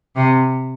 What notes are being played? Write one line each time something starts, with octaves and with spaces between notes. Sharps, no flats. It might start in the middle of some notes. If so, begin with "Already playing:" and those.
C3